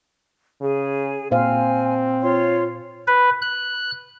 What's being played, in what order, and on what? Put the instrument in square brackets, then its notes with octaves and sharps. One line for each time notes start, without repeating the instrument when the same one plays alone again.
[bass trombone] C#3 [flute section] G#4
[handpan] A#2 C5 F5 [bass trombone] C4 [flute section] G#5
[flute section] F4 C#5 C6
[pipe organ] B4
F#6